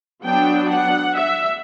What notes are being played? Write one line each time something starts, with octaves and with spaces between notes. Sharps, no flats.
F#3 B3 D4 G5
F#5
E5